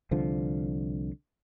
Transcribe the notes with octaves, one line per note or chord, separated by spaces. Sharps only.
C2 D3 F3